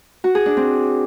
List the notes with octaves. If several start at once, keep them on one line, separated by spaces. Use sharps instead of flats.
F#4
G#4
D4
C4